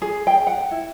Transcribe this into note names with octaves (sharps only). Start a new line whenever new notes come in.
G#4
G5
F#5
E4